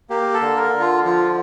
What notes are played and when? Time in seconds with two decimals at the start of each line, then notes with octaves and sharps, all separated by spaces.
0.10 A#3 G4
0.34 A4
0.41 D3
0.57 A#4
0.73 D3
0.80 F4
1.04 F3 F4